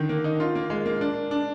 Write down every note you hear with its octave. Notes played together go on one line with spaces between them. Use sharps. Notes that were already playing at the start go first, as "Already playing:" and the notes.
Already playing: D3 D#3
A#3
D#4
F4
A#3
G#3
A#3
D4
D4